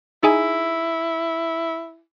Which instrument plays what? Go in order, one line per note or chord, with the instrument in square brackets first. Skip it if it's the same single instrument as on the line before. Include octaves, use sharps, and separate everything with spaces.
[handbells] D#4 G#4 G#5 [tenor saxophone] E4